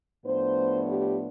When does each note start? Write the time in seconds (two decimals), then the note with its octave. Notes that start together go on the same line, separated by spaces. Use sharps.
0.25 A2 F3 B3 D4 C5
0.87 G4